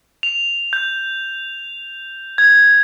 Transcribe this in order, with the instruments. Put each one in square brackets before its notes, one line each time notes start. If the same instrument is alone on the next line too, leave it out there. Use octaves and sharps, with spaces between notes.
[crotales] F7
G6
G#6